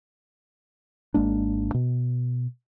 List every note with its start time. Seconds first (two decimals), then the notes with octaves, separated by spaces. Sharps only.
1.14 G#1 G#3 A#3 D4
1.74 B2